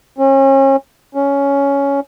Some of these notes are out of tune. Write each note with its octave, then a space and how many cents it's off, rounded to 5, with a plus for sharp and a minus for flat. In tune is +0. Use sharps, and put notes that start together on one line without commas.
C#4 -35
C#4 +10